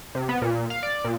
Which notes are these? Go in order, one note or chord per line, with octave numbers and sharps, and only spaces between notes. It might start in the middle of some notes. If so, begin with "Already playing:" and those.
C3
B3
A#2
F5
D5
A#2